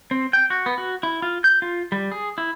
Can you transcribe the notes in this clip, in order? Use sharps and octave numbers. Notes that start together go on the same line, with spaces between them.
C4
G5
F#4
B3
F#4
E4
F4
G6
F4
G3
G#4
E4